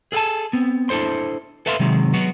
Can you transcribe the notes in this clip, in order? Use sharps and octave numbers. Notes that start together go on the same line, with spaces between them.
G#4 A4 F#5 G#5 A5
B3 C4
D4 E4 A4 C5 C6
A4 B4 E5 F5 C6
C3 D#3 F#3 G#3
F#3 G#3 B3 F#4